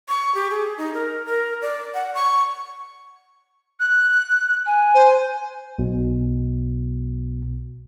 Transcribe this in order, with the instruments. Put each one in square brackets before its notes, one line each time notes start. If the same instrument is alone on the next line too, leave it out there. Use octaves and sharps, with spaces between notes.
[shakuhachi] C#6
G4
G#4
D#4
A#4
A#4
D5
F#5
C#6
[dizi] F#6
[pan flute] G#5
[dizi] C5
[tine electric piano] B1 B2